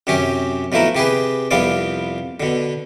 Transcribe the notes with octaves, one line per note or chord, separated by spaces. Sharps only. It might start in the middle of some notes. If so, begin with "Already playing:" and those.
F#2 C3 C#4 G4
B2 F3 A3 E4 A#4
C3 G4 G#4 B4
C2 F2 C3 B3 F4 D5
B2 D3